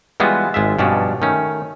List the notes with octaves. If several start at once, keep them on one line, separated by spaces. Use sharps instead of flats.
E3 G3 G#3 B3 F4 F#4
G#1 G#3 F4 E5
G2 B2 F3 C#4 D4
D#3 A3 C#4